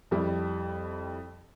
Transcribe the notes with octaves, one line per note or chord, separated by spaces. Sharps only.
F2 G3 E4